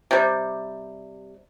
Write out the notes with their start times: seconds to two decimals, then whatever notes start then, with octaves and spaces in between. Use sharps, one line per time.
0.11 C3 G3